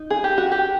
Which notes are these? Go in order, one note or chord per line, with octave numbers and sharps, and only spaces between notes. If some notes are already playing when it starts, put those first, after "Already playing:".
Already playing: D#4
G#4
G4
F#4
G4